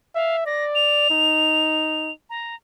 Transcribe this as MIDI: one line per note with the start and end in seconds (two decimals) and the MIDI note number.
0.15 0.42 76
0.15 0.37 77
0.46 1.05 74
0.46 0.64 94
0.75 2.11 101
1.10 2.12 63
2.30 2.55 82